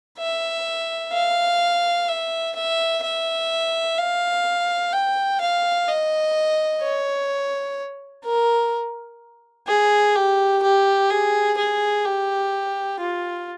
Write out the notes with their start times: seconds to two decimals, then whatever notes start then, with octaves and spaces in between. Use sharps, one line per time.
0.18 E5
1.13 F5
2.08 E5
2.56 E5
3.03 E5
3.98 F5
4.93 G5
5.40 F5
5.88 D#5
6.82 C#5
8.25 A#4
9.67 G#4
10.15 G4
10.62 G4
11.10 G#4
11.57 G#4
12.05 G4
13.00 F4